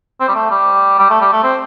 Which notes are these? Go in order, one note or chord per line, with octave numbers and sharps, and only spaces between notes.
C4
G3
A3
G3
G3
A3
G3
A3
C4